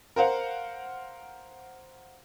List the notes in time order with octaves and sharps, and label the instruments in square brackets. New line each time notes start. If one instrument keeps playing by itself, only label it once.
[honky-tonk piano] A#4 C5 F5 F#5